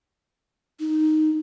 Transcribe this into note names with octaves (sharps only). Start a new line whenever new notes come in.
D#4